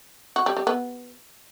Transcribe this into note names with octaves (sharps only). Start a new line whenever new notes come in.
F#4
G3
G3
B3